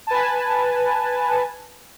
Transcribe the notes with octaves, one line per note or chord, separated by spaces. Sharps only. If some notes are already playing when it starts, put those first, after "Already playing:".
B4 G#5 A5